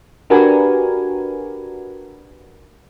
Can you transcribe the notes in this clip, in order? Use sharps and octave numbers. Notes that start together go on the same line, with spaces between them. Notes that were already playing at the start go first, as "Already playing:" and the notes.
D4 F#4 G4 A#4 B4 G#5